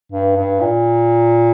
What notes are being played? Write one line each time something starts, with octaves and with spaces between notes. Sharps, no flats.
G2
G2
A#2